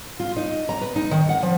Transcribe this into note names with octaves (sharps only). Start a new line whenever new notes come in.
F4
D#4
A#5
B4
D#4
D#3
F#5
F3